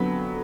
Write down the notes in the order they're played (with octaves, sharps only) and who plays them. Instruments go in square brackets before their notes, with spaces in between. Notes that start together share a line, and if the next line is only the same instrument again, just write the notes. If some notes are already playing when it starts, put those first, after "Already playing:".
Already playing: [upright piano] F2 D3 F#3 B3 B5